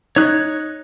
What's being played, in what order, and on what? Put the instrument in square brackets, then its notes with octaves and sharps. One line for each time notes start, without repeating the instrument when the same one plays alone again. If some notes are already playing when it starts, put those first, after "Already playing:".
[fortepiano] D#4 [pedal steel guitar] C#5 F#6